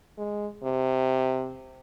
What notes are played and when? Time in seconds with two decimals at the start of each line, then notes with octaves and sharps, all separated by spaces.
0.18 G#3
0.64 C3